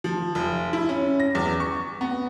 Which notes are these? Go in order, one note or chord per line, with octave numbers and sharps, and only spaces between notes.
F3
F1
E4
C#4
A#6
E2
C#6
B3